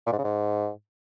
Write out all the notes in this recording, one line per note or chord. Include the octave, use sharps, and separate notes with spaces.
A#2
G#2
C#3
G#2